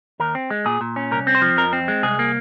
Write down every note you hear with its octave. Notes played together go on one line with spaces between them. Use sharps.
D#2 A#4
C4
G#3
A#2 G#4
A#2
C#4
C2 A#4
C4
C5
F3
F2 A#4
C4
G#3
C2 G#4
A#3